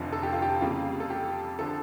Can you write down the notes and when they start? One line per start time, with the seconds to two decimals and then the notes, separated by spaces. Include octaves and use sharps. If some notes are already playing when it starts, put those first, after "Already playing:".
Already playing: F1 F2 D3 F3 F4
0.13 A4
0.23 G4
0.32 F4
0.42 G4
0.61 F2 C#3 G3 A#3 F4
1.00 A4
1.10 G4
1.59 D3 F3 A4